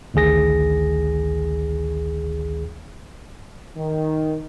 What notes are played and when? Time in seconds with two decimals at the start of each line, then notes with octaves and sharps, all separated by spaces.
0.14 A1 D2 D#3 G#4 A#6
3.77 D#3